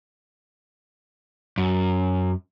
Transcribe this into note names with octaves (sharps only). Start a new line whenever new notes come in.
F#2